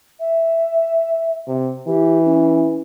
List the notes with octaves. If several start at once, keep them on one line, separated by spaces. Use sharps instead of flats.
E5
C3
E3 G4
C#4